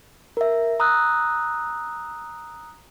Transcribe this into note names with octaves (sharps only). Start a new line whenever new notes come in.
A#4 E5
A#5 D#6 E6 F#6